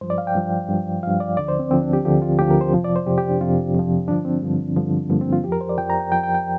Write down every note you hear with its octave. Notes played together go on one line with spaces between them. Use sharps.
G2 F3 C5
D5
F5
G5
G2 F3
G2 F3
G2 F3 F5
D5
D2 D3 F3 D5
C5
C4
D2 D3 F3 C4
D4
G4
D2 D3 F3 G4
F4
D2 D3 F3 G4
A#4
C5
F2 C3 F3
D5
C5
F2 C3 F3 G4
G4
D4
F2 C3 F3 F4
F2 C3 F3
G2 D3 F3 D4
C4
G2 D3 F3
G2 D3 F3
G2 D3 F3 A#3
C4
F4
F2 F3 G4 A#4
C5
D5
F2 F3 G5
A#5
G5
F2 F3 G5
G5
G5